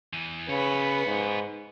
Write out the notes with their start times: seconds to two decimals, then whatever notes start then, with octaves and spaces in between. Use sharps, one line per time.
0.13 E2 E3
0.49 C#3 B3 B4 C#5
1.06 G#2